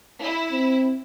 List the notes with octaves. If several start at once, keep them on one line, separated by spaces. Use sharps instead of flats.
E4
C4